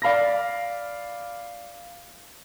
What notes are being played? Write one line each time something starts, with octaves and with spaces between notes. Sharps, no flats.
D5 F5 B5 A#6